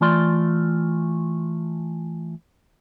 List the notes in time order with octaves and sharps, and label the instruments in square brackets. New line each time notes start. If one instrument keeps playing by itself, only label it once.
[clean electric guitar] E3 A3 F4 D5 C6